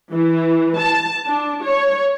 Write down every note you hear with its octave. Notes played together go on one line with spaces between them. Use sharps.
E3
A5
D4
C#5